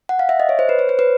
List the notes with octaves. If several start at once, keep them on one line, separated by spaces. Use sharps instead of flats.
F#5
F5
E5
D#5
C#5
C5
B4
C#5
C5
B4